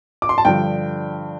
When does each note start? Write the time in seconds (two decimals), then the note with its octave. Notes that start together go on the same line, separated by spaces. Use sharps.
0.22 D6
0.29 C6
0.38 A5
0.45 G2 D3 F3 G5